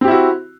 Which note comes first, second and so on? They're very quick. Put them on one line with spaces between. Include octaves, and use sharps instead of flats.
C4 G4 E4 F#4